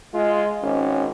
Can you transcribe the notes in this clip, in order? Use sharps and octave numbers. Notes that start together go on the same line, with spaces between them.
G#3 F4
G#1 C#4